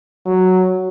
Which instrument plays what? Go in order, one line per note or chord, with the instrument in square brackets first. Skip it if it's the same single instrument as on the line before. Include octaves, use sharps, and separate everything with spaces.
[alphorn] F#3